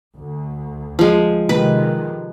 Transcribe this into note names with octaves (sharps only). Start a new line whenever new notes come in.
D2
F3 G#3
C3 D#3 G#3 B4